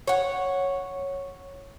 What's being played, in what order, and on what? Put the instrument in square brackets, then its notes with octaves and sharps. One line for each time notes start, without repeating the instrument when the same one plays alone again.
[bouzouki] C#5 F#5